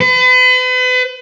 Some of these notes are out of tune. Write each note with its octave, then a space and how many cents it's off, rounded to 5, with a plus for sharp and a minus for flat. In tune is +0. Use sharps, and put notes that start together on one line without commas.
B4 +40